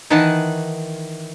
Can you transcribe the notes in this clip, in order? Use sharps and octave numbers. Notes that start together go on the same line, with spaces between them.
D#3 E3 D#4 F#5 A5